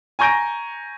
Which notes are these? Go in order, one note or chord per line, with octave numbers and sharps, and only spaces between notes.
G#5 A#5 C#6 G6 A#6 D7